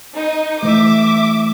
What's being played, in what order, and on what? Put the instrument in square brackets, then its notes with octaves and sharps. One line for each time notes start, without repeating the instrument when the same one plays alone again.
[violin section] D#4
[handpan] E3 A3 [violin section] E5 D6